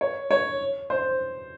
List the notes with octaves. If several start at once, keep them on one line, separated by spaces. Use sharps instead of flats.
C#5
C#5
C5